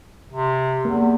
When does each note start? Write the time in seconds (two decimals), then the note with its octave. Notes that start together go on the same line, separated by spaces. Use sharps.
0.33 C3
0.85 E2 A#3